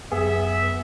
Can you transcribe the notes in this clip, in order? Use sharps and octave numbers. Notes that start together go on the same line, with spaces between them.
F#2 B3 G#4 E5